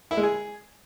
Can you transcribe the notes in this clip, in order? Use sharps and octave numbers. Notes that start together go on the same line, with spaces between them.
E4
G#3
G#4